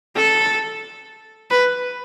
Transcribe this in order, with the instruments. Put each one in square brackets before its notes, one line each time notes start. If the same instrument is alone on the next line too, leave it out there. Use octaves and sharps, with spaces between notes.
[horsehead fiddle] A4
B4